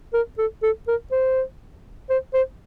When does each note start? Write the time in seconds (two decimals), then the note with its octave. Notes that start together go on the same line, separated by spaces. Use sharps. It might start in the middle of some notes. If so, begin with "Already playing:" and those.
0.13 A#4
0.38 A4
0.63 A4
0.88 A#4
1.12 C5
2.10 C5
2.34 C5